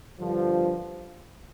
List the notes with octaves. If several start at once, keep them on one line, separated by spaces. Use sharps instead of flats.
G2 D3 F3